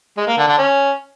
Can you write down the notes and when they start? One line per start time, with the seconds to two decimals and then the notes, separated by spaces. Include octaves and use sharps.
0.17 G#3
0.27 A#3
0.38 D3
0.48 D3
0.58 C#4